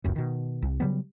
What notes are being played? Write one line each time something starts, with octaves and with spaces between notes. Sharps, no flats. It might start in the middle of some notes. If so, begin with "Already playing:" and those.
F#1 C#2 F#2
B2 D#3
C2
C#3 F#3 G3 B3